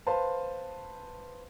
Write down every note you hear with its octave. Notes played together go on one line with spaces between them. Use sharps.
B4 C5 F5 A5